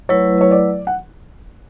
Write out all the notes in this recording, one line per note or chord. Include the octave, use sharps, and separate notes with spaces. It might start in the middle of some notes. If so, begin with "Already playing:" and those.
F#3 A3 E4 B4 C#5
C#5
D5
F#5